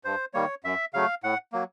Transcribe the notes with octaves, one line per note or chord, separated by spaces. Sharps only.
G2 C5
D#3 G3 A#3 C#5
F#2 E5
C#3 F#3 A3 F5
A2 F#5
F#3 A#3